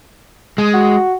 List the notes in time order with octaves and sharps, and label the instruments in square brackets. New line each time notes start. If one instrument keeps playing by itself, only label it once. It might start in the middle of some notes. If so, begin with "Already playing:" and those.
[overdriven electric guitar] G#3
[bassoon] F#4